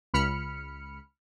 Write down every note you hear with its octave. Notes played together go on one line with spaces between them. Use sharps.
C#2 B5 F6 C#7